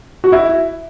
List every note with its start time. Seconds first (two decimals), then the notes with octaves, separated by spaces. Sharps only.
0.24 F#4
0.32 E4